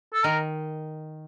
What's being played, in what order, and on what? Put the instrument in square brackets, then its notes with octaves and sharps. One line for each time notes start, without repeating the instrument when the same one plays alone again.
[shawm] A4
[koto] D#3 [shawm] A#4